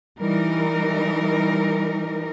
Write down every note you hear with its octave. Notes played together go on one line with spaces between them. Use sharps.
E3 G3 D#4 A#4